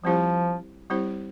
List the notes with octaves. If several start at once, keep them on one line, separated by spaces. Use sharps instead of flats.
F3 G3 C4 E4 G4 C5
G3 C4 E4 G4 C5